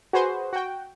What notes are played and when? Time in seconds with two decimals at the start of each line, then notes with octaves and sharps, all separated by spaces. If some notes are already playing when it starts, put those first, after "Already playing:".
0.13 F#4 G#4 B4 C5
0.53 F#4 G5